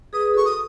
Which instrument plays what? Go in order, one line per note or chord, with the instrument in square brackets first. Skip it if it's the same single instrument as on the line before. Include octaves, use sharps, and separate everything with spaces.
[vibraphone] G#4 B4 [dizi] D#6
[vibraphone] F#4 A4 [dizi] C#6
[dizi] D#6